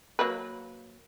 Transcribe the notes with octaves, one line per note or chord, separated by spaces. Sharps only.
F#3 A#3 B4